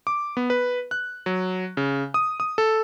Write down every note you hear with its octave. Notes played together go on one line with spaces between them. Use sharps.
D6
B3
B4
F#6
F#3
C#3
D#6
D#6
A4